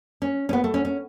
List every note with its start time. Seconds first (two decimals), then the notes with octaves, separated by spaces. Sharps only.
0.22 C#4
0.49 C#4
0.53 B3
0.64 A3
0.74 C#4
0.85 C#4